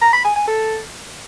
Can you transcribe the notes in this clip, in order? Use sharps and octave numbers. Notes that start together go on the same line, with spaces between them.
A#5
B5
G#5
G#5
A4